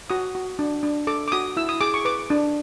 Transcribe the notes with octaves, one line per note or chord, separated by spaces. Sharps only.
F#4 D#6
F#4
D4
D4
A4 D6
D6
F#4 D#6
E4 E6
D#6
G#4 D6
C#6
B4 D6
D4